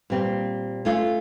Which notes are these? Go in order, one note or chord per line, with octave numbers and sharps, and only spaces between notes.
A#2 G3 C4
A3 C#4 F4